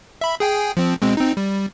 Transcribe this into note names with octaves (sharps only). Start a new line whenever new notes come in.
E5 B5
G#4 G5 G#5
F3 C4
B2 G#3 C4
C4 D#4
G3